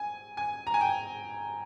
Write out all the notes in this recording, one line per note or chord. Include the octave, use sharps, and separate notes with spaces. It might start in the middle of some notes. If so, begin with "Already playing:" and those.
Already playing: G#5
G#5
A#5
G#5
G5